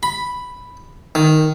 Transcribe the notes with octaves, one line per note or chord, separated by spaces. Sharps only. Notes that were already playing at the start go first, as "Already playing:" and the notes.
B5
D#3